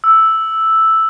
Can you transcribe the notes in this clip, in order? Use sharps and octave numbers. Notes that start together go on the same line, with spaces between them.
E6